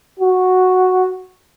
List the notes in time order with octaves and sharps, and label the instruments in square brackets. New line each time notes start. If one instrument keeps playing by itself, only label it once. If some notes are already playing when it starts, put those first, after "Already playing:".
[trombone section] F#4